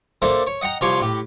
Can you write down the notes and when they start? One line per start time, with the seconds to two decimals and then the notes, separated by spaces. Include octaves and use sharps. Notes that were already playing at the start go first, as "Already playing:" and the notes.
0.22 A#3 D4 A4 C5 D5 E5
0.47 C#5
0.62 D#5 F#5 G5 A#5
0.81 C2 F3 C#5 G#5 C6 D6
1.00 A2 G4